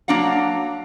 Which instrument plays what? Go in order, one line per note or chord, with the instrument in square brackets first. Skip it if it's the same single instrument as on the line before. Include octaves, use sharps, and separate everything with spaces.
[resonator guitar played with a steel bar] F#3 A#3 D4 F5 F#5